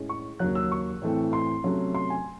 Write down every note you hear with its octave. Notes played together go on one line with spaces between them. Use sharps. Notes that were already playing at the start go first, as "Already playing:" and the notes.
Already playing: A2 G#3 C#4
C#6
D#2 C#3 F#3 F#6
E6
C#6
A2 E3 A3 C4
C6
C3 F#3 A3 C#4
C6
G#5